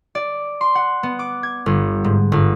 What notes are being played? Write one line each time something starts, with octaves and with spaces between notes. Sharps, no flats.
D5
C6
F#5
B3
D6
G#6
G1
G#2
G1